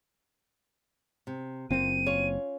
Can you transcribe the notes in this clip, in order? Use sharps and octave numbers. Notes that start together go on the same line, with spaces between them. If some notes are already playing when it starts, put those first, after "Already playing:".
C3
F#1 A#3 C4 F4 D#7
C#4 F4 C#5